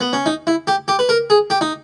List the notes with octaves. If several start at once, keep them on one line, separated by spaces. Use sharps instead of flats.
B3
C#4
D#4
E4
G4
G4
B4
A#4
G#4
G4
D#4